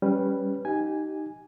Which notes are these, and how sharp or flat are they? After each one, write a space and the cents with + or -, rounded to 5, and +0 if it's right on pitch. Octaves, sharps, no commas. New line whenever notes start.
G3 +0 C#4 +0 B4 +0
D#4 +0 G4 -25 G#5 +0